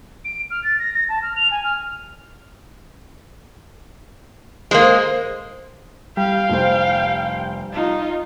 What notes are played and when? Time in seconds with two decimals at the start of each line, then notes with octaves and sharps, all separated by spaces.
0.25 D7
0.50 F6
0.64 A6
0.79 A#6
0.93 A#6
1.09 A5
1.22 F6
1.36 F7
1.51 G#5
1.64 F6
4.71 G#3 A#3 C5
6.17 G3 F5 G5
6.49 F1 C5
7.73 D#4 F4